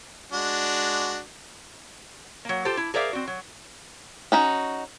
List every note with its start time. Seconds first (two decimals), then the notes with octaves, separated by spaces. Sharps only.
0.32 G#3 D4 F#4
2.45 F#3 A#3
2.65 F4 G4 A4 C5
2.77 E4
2.94 G#4 A#4 C5 D5 E5 F5
3.13 C4 F#4
3.27 F#3
4.32 C#4 D#4 F#4